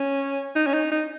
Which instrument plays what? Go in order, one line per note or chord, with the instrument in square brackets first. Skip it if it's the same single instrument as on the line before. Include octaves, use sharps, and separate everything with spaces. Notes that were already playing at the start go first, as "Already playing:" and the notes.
Already playing: [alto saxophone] C#4
D#4
C#4
D#4
D#4